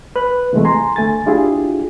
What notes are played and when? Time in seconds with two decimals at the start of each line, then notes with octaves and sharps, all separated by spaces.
0.16 B4 F#6
0.53 C3 E3 G#3 A3
0.65 G#5 A#5 C6
0.96 D2 A3 G#5 A6
1.26 D4 E4 F4 G4 G#4